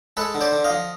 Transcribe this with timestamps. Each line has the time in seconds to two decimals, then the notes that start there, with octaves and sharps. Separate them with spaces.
0.17 G#3 A4 B4
0.35 D3
0.41 C5 D5
0.52 D3
0.64 D#5 F5
0.70 F3